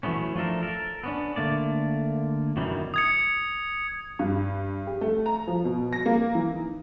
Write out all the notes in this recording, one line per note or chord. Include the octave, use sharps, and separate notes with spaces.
E3 F#3 A3 B3 C#4
F3 A3 D4 A4 A#4
A4 A#4
B3 C#4 D4
D3 A3 A#3 D5
F#2 B2 D#3 E3 G3
D#6 G#6 C#7
G2
G4
A3
A#5
F3
B2
A#6
A#3
E3
D#4